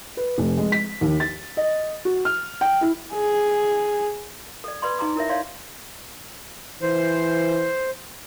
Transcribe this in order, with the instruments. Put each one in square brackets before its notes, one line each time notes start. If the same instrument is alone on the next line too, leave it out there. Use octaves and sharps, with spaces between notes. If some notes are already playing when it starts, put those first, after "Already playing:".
[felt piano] B4
F1
G#3
B6
D#2
A6
D#5
F#4
F6
G5
E4
[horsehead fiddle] G#4
[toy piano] A4 D5
B4 D5 B5 C6
D#4 G#4 A#5 C6 D6
E4 A#4 C#5 E5
C#5 D5 F5 C6
[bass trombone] E3 [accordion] C5